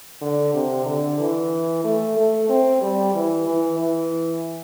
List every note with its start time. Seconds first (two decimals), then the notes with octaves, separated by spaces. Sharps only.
0.22 D3
0.54 C3
0.86 D3
1.20 E3
1.84 A3
2.17 A3
2.49 C4
2.82 G3
3.15 E3
3.47 E3
3.80 E3